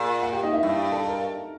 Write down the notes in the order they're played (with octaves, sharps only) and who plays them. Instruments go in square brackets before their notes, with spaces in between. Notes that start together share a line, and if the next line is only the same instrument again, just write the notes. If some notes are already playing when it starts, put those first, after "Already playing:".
Already playing: [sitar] A#2 [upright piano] G#4
[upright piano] F#5
G4 G5
D#4 D#5
E4 E5
[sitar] G2
[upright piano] A4 A5
A#4 A#5